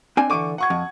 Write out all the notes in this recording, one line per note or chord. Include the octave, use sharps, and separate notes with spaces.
C4 D4 G#5
D3 E3 C#6 D6 D#7
F#5 C#6 G#6
F2